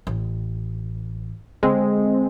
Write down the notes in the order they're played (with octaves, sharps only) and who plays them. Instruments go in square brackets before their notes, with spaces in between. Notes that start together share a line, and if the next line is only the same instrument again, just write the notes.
[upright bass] A1
[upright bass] D3 [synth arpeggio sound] G#3 C4